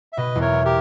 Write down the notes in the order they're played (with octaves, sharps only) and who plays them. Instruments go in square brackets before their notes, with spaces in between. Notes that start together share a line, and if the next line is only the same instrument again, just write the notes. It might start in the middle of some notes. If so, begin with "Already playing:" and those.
[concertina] E5
[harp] B2 [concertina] B4 D#5
[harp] E2
[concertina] A#4 C#5
[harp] B3
[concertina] G4 A#4